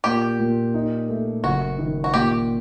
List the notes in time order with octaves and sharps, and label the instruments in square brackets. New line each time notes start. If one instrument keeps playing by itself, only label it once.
[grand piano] A#2 [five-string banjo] G4
[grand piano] A#2
D#4
A3
[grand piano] F#1 [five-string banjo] F#4
[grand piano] D#3
[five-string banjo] F#4
[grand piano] A#2 [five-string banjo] G4